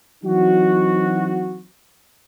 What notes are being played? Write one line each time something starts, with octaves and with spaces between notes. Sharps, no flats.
E3 F#3 C4 D#4 F#4